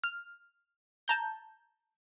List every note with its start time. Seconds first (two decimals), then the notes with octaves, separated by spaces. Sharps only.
0.04 F6
1.08 A5 A#5 G6